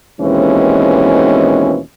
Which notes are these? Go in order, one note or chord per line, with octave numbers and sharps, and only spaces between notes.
D#2 B2 E3 G#3 C4 C#4